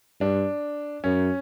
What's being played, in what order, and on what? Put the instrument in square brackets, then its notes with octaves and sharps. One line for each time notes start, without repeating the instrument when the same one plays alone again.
[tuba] G2 [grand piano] D4
[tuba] F#2 [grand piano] C#4